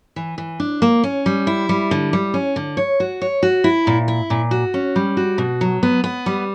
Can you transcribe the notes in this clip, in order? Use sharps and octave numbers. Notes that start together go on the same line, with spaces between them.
E3
E3
D4
A#3
C#4
G3
E4
G3
D3
G3
C#4
D3
C#5
F#4
C#5
F#4
E4
A#2
E4
A#2
F#4
C#4
G3
F#4
B2
F#3
B3
B3
G3